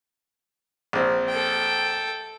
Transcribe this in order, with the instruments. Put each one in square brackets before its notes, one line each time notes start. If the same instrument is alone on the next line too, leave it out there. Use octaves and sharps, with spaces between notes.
[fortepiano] A#1 C4
[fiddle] A4 G5